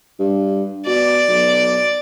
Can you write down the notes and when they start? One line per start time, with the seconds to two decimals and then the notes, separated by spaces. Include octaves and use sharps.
0.19 G2
0.86 B2 D5
1.28 B1